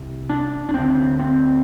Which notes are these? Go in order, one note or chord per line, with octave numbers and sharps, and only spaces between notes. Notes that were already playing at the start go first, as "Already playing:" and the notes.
Already playing: C2 C3
D4
D4
D2 D3 C4
C4